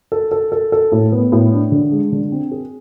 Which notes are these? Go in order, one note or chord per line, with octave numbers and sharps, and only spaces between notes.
A4
A4
A4
A4
A2
B3
A2
D4
D3
G#3
D3
C4
G#4